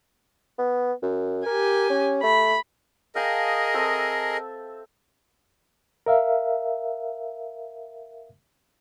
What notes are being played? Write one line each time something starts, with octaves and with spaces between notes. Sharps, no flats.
B3
F#2
G4 A#4 G#5
C#4
A3 B5
G#4 A#4 D#5 F5 G5 A5
C4 A4 E5
A#4 E5 F5